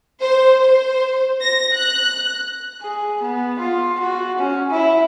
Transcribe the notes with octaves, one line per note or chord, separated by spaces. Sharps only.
C5
C5
A#6
F#6
G#4
B3
F4
F#4
C#4
E4